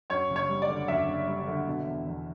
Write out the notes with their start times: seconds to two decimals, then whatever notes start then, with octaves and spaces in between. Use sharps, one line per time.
0.10 F#2 C#5
0.30 F#1
0.36 C#5
0.49 G3
0.62 D5
0.69 D3
0.88 F#2 E5
1.08 F#1
1.27 G3
1.47 D3
1.67 B2
1.87 E2
2.07 E2